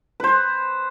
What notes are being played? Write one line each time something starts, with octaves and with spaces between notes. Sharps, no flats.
B4 C5